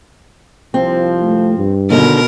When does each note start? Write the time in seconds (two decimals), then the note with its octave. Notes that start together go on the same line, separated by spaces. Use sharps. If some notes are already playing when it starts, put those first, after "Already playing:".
0.74 C2 F3 C4
1.22 A3
1.59 G2
1.90 D#2 B2 D3 D#4 A#4